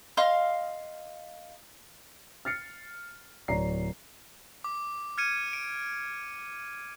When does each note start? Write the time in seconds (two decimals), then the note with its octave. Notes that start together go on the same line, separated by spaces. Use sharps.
0.17 D#5 F5 C6 F6
2.45 F6 A6 C7 C#7
3.48 D1 C#5 D5 A#5 C7
4.64 D6
5.18 F6 G#6 C#7 D#7
5.53 D7